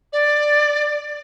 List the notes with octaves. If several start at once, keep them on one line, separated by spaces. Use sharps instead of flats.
D5